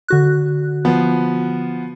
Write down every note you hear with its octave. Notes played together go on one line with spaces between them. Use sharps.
D3 F#4 F#6
F3 B3